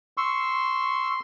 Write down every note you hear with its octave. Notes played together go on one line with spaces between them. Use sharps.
C6 C#6 E6